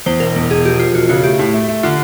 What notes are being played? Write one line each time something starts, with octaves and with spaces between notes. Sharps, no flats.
E2 C5
E1 A#4
E2
E1 G#4
F3 G4
F3 F4
E1 F#4
C#3 F#4
A3 G4
A2
A3
A3
D3 F4